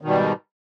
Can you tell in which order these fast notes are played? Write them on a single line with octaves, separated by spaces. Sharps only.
D#3 B2 G3 G#2